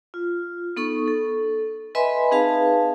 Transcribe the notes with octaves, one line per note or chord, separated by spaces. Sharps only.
F4
B3 D#4 A4 C#6
A4
B4 D#5 E5 G#5 B5 C6
C4 D#4 G#4 B4 F5 A5